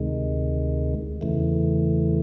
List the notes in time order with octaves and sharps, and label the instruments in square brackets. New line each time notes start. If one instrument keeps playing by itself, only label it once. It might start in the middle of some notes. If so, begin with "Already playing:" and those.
Already playing: [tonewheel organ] D2 C3 D#3 G#3
E2 C#3 E3 A3